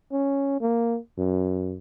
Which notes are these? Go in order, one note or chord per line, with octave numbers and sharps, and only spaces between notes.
C#4
A#3
F#2